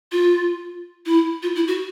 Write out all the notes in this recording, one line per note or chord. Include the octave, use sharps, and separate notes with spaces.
F4
E4
F4
E4
F#4